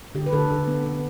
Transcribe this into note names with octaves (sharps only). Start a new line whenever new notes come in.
D3 G4
B4
D3 A4
D3
B3
B3